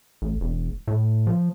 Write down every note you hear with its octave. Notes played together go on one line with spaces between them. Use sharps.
A1
E1
A2
F3